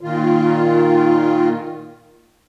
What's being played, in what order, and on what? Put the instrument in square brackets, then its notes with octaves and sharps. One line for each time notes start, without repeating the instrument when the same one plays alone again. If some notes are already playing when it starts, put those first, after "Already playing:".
[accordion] A#2 D#3 F4